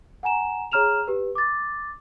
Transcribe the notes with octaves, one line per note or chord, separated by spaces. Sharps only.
F#5 G#5 A#5 E7
G#4 C#5 A#5 F6 E7 F7
G4 B4
D6 A6